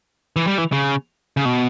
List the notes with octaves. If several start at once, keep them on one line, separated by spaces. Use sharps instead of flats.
E3
G3
E3
C#3
C#3
B2